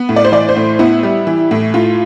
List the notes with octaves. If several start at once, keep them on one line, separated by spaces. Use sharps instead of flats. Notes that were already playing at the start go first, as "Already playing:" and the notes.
Already playing: B3
A2
D5
C5
E3 D5
C5
A2
B3 E4
G3
E3
A2
A2 F4